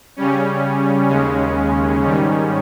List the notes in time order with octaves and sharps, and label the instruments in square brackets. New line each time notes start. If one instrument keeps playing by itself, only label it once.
[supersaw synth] C#3 G3 C#4
D#2 C#3 G#3 C#4
G#2 D#3 G3 C#4